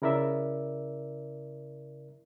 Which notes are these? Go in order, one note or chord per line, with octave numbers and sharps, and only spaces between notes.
C#3 E4 A#4 D5 E5